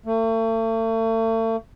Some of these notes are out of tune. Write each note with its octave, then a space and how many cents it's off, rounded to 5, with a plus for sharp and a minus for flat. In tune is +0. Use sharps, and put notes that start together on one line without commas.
A3 +40